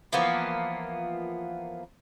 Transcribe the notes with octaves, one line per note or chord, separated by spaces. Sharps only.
E3 F3 A#3 B3